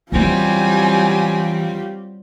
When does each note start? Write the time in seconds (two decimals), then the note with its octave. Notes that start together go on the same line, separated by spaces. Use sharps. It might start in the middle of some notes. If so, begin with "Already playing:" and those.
0.12 E2 E3 F#3 G3 C4 F4 G4 G#5